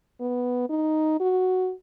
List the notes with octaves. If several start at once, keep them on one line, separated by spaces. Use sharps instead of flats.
B3
D#4
F#4